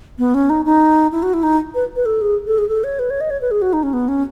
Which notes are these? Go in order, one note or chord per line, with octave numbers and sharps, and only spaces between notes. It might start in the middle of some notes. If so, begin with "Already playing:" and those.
B3
C#4
D#4
D#4
E4
F#4
E4
D#4
B4
B4
A4
G#4
A4
G#4
A4
C#5
B4
C#5
D#5
C#5
B4
G#4
F#4
D#4
C#4
B3
C#4